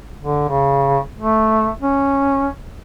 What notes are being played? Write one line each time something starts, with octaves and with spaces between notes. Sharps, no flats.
D3
C#3
A3
C#4